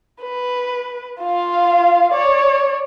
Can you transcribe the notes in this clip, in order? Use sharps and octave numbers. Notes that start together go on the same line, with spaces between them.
B4
F4 F5
C#5 D5